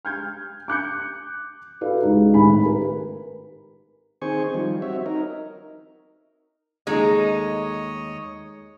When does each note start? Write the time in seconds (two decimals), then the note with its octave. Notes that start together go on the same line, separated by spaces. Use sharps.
0.05 F6 G6 G#6
0.68 D6 F#6 G6 C#7
1.81 E4 F#4 A4 B4 D5 F5
2.02 C#2 G#3 D#4
2.34 G#1 A2 G4 G#5 B5
2.66 A#4 B4
4.22 D#3 C4 G#4 C5 G#5 C#6
4.54 D#3 F3 G3
4.82 C4 F#4 C#5 E5
5.06 D#4 A#4
6.87 D#2 G#3 A3 D#4 G#4 C#5 D#5